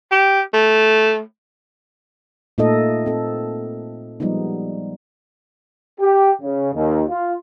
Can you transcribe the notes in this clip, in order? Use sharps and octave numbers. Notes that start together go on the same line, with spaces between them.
G4
A3
A#2 A3 A#3 D#4 A4 D#5
C4 A4
F3 G3 G#3 B3 D#4
G4
C#3
D#2
F4